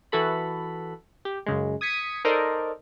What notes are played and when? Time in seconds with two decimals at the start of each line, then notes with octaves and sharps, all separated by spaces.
0.12 E3 F#4 A4 B5
1.25 G4
1.46 F#2 C#3 G#3
1.81 D#6 G#6 B6 C#7 D#7
2.25 D#4 A4 A#4 C5 D5 D#5